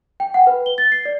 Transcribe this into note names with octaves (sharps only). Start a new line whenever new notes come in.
G5
F#5
B4
G7
A6
C7
D5